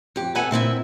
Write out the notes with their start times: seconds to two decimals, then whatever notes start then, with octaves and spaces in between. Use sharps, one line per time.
0.16 F2 G4
0.35 B2 B3 A4 E5 F#5 G#5
0.51 A#2 C4 E4 E5